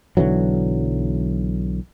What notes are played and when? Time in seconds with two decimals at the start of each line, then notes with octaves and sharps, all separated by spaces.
0.17 B1 D3 E3 F#3